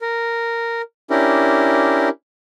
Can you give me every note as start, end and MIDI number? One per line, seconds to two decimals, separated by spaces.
0.01 0.82 70
1.10 2.09 61
1.10 2.09 62
1.10 2.09 64
1.10 2.09 67
1.10 2.09 70